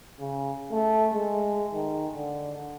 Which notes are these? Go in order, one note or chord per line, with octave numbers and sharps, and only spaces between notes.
C#3
A3
G#3
D#3
D3